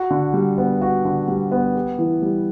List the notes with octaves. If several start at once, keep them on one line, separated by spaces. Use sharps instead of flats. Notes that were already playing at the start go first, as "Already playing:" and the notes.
Already playing: F#4
D3
G3
B3
F#4
D3
G3
B3
G4
E3
G3